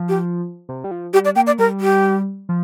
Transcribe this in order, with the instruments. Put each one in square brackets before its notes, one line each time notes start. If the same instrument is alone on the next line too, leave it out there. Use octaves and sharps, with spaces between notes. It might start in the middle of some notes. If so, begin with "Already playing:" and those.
Already playing: [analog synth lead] F3
[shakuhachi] G4
[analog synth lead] C3
G3
F3
[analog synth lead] G3 [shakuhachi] G4
[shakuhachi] D5
[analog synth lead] A#3 [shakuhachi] G5
[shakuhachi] D5
[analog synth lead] G3 [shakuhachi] A#4
[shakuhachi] G4
[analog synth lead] F3